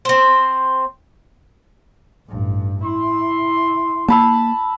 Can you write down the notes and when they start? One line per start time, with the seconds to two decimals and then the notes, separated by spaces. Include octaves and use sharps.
0.05 C4 C5
2.29 A1 G2
2.84 E4 C6
4.08 A#3 A5 B5 E6